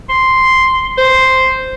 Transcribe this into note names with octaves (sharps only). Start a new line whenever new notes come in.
C6
C5